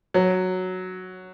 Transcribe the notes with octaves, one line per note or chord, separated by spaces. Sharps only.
F#3